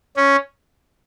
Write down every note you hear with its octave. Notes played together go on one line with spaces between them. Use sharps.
C#4